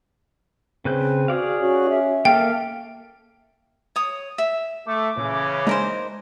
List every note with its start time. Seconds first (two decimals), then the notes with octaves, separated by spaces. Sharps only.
0.85 C#3 C4 B4 G6
1.28 F#4 G#4 D5 F5
1.61 C#4 F#4
1.90 E5
2.25 A#3 A4 F5 G5
3.96 C#5 D#6
4.38 E5
4.86 A3 D6
5.18 A#2 C#3 E3 C#4
5.67 G#3 A#3 D4 D#4 A#4 C5